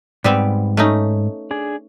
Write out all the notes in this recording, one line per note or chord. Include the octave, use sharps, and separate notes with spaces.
G#2 G3 B3 C4
A3 C#4 D#4
D4 G#4